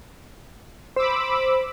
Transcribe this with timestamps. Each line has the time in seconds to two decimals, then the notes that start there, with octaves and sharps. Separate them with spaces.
0.96 C5 B5 D6 E6